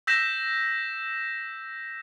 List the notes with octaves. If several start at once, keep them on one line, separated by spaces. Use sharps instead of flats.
E6 G6 A#6 B6 E7